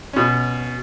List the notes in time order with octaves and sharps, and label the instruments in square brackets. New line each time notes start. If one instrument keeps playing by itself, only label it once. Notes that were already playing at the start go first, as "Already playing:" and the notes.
[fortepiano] B2 C#4